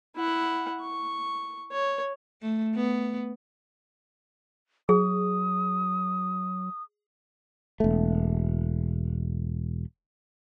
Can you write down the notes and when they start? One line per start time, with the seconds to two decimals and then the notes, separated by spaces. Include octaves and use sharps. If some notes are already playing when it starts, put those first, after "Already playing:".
0.16 E4 F#5
0.80 C#6
1.72 C#5
2.42 A3
2.75 B3
4.89 F#3 G#4 D#6
7.80 E1 A3